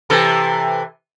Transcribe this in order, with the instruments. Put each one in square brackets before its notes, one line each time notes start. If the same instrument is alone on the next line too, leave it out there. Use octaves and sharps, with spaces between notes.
[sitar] C3 E3 A4